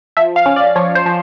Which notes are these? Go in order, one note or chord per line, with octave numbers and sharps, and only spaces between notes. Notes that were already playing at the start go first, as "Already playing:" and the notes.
F3 E5
F5
C#4
D5
F3 C#5
C5
F3